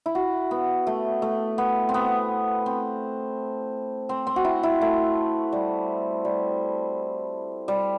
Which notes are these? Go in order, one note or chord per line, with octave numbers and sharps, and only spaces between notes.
E4
F#4
B3
A3
A3
B3
C4
B3
C4
C4
C4
F#4
E4
E4
A3
G3
G3
G3